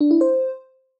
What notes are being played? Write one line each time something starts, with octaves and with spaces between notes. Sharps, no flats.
D4
E4
C5